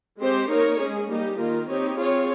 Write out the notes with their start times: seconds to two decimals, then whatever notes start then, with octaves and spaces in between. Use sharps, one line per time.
0.19 G#3 C4 G4 C5
0.49 A#3 D#4 A#4 C#5
0.79 G#3 C#4 G#4
1.09 G3 A#3 D#4 G4
1.38 D#3 A#3 F4 A#4
1.68 C4 D#4 G4 C#5
1.98 C4 F4 G#4 C#5